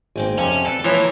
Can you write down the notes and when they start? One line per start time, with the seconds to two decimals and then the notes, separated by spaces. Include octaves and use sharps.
0.16 G#1 A#3 C4 G#5
0.38 F2 C3 C#4
0.65 A4 B4 D5
0.84 E3 F3 A#3 F4 A#4 C#5